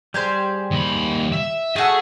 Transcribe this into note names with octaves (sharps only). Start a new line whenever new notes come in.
G3 G4 G#4 C5
D#2 B5
E5
A3 F#4 G#4 A4